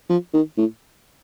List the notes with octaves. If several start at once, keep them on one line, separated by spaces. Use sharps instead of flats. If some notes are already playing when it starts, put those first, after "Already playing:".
F3
D#3
A2